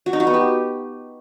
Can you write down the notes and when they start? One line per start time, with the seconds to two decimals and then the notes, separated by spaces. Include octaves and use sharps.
0.06 F#4
0.13 D#4
0.20 F#4
0.27 B3
0.34 G4